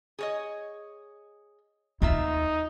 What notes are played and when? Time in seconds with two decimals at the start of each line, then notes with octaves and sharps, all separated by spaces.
0.19 G#4 C#5 D#5
2.02 D#2 C3 D#4 F4 E5